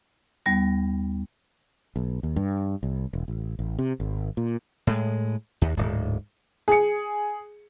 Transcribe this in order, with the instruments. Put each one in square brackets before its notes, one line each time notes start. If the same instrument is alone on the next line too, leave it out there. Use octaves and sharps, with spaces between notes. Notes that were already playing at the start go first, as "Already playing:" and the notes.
[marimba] D#2 G3 B3 A#6
[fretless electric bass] B1
D#2
G2
C2
E1
A1
A1
C3
G#1
A#2
[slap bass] A2 G#3
D#2
D1 G#2
[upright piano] G#4 C#7